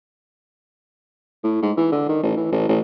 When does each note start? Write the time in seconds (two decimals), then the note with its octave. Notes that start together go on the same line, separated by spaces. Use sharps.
1.43 A2
1.62 G#2
1.77 E3
1.92 D3
2.09 D#3
2.23 A1
2.37 E3
2.51 A1
2.69 A1